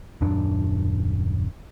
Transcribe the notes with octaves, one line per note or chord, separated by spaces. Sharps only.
D#1 F#2 D4